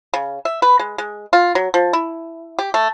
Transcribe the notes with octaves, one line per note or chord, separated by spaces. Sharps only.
C#3
E5
B4
G#3
G#3
F4
F#3
F3
E4
G4
A3